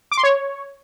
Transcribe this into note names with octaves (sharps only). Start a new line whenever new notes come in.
D6
C6
C#5